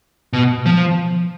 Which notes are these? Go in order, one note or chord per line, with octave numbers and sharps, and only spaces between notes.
B2
F3